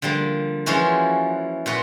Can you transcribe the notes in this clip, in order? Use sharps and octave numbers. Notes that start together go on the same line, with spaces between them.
D3 F3 G3 A#3
E3 F3 G#3 C#4 E4 F#4
A#2 F4 F#4 B4